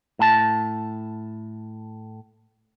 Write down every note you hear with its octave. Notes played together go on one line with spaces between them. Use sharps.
A2 A5